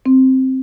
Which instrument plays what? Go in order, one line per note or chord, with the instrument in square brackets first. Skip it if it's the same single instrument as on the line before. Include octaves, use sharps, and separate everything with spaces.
[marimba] C4